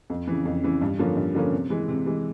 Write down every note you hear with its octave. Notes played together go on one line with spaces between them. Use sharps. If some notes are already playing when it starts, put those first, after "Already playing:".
F2
C#3 E3
F2
C#3 E3
G2
D3 F3 A#3 C#4
G2
D3 F3 A#3 C#4
C3
E3 G#3
C3
E3 G#3